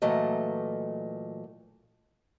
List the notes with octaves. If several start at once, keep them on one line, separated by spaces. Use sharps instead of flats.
A#2 E3 F#3 A3 D#5